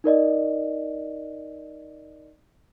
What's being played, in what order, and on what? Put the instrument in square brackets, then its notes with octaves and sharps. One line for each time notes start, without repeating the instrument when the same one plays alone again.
[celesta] D#4 A#4 D5 D#5